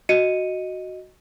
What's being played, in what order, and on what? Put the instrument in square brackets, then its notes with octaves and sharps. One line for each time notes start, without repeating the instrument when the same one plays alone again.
[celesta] F#4 D#5 C#7 D#7